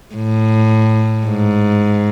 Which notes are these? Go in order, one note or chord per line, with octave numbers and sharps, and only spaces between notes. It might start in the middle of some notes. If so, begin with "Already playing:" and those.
A2
G#2